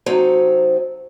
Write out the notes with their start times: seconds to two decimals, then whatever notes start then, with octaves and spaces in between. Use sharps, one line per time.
0.06 C3 F#3 C4 D#4 A4 A#5